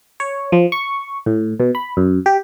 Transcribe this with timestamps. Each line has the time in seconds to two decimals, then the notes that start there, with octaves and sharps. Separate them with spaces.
0.20 C#5
0.52 F3
0.72 C#6
1.26 A2
1.60 B2
1.75 B5
1.97 F#2
2.26 G4